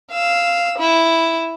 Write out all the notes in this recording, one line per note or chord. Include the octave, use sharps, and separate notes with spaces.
F5 E6
E4